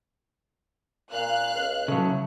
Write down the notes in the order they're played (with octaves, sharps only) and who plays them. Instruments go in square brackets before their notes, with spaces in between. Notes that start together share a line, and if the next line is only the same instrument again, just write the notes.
[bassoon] A#2 [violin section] F5 F#6
[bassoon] C#2
[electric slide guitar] C#3 F#3 [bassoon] A3